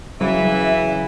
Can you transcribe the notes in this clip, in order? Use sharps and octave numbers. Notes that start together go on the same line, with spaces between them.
C#3 E3 F#3 E5